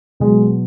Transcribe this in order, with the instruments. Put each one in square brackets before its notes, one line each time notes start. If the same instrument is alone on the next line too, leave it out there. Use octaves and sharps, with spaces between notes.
[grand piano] B2 F#3 G#3